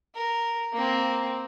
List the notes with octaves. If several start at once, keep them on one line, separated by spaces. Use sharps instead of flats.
A#4
A#3 C4